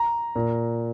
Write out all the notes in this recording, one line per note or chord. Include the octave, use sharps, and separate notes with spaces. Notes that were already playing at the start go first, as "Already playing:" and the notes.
Already playing: A#5
A#2